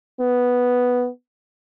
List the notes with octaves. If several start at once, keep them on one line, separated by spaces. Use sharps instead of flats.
B3